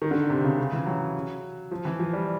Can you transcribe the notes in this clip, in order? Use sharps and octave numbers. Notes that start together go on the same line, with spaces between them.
D#3
D3
C3
C#3
C#3
E3
F#3
F3
E3
F3
G3